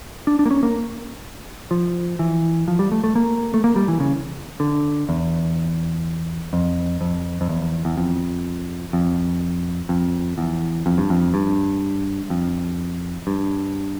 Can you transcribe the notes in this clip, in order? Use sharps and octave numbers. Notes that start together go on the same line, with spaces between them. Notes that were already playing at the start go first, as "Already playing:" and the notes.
D4
D4
A#3
C#4
A#3
F3
E3
F3
G3
A3
A3
A#3
A3
A#3
G3
E3
C#3
D3
E2
F2
F2
F2
E2
E2
F2
F2
F2
E2
F2
G2
F2
G2
F2
G2